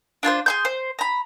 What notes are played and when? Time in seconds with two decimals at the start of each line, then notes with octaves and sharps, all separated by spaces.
0.23 D4 F4 B4 C5
0.46 G#4 C6 G6
0.65 C5
0.99 A#5 B5